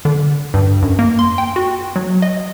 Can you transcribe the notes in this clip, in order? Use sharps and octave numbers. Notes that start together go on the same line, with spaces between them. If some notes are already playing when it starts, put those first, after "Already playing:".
D3
G2
F#2
A#3
C6
G5
F#4
F#3
D#5